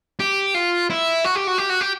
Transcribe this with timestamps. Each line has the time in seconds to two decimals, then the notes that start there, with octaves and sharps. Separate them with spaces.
0.20 G4
0.54 F4
0.90 E4
1.24 F#4
1.35 G4
1.47 F#4
1.58 G4
1.70 F#4
1.81 G4